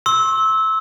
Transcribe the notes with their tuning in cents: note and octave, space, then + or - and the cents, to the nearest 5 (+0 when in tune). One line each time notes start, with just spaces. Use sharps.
C6 +40 E6 -20